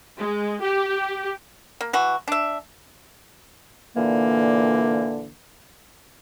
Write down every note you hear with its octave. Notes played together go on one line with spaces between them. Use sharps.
G#3
G4
A#3
E3 F#4
D4 E5
A#2 D3 E3 A#3